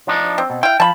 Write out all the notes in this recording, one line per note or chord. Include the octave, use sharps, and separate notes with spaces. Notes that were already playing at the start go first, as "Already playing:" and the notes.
F3 D4 D#4
C4
B2
E4 F5 G5
F3 A5 B5